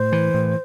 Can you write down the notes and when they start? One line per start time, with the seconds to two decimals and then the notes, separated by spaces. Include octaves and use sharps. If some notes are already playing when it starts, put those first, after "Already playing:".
Already playing: A2 C5
0.12 E3
0.34 A2